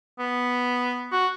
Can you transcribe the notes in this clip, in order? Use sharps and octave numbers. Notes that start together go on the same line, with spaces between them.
B3
F#4